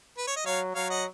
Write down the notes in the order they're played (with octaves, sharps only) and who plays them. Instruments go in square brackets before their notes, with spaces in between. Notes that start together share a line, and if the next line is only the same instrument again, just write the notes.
[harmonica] B4
C#5
D#5
[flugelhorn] F#3 [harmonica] C#5 F5
[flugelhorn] F#3 [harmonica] C#5 F5
[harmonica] D#5 F#5